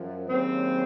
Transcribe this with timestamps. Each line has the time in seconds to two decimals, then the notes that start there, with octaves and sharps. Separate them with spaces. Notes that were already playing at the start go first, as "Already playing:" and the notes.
Already playing: F#2 F3
0.27 D#2 C#3 F#3 C4